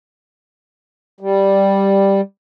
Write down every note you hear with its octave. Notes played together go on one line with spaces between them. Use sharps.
G3